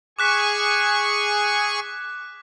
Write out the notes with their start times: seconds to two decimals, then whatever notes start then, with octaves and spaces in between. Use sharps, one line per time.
0.19 G#4 G#5 C#6 D6 F#6 B6